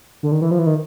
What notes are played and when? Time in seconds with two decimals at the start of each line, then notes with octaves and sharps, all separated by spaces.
0.23 D3
0.32 D#3
0.42 E3
0.51 F3
0.59 E3
0.67 D#3